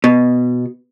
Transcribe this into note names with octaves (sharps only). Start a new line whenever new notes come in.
B2